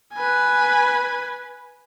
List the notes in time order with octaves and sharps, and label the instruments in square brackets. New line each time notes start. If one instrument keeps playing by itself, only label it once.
[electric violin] B4 G#5